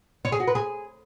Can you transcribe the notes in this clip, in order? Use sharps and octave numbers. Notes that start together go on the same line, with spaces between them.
C#5
G#4
F#4
B4
G#4